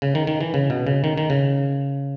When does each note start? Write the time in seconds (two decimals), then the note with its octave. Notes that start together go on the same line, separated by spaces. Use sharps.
0.02 C#3
0.15 D#3
0.27 D#3
0.41 E3
0.54 C#3
0.70 B2
0.87 C#3
1.04 D#3
1.18 D#3
1.30 C#3